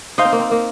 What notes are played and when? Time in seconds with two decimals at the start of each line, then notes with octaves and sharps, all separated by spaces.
0.18 D#4 C5 F5 C6 D#6
0.25 C4
0.33 A#3
0.40 C4
0.51 A#3